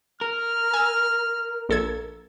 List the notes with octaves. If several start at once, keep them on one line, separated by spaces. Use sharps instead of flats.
A#4 F6
G#5 E6
A#1 A4 G#6